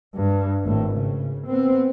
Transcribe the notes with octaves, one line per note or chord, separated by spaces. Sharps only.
G2
G#1 A2
C#3
B3 C4